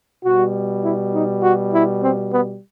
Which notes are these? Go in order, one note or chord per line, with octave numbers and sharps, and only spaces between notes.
B2 G3 F#4
E4
D#4
F#4
E4
C4
B3